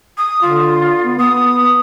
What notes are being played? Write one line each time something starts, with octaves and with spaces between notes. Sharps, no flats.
D#6
D3 F4
B3
B3 D#6